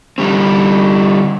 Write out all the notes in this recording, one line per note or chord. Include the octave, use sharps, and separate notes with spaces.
D3 G3 C4